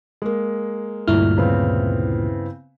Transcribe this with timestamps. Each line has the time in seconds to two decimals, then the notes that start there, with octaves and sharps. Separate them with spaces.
0.22 G#3 A#3
1.08 D2 G2 A#2 E4 F6
1.38 C#3 B3 C4